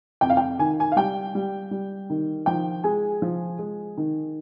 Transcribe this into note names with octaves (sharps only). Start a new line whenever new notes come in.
F2 G5
F5
G5
D#3 G#5
G#5
F5
G3 G5
G3
G3
D#3
F3 G5
G#3 G#5
F3
G#3
D#3